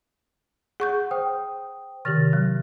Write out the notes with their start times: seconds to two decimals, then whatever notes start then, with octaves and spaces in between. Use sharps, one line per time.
0.80 G#4 F#5 C#6 G6
1.11 C5 G5 D#6
2.05 C3 D#3 G4 F6 A6 A#6
2.33 F#3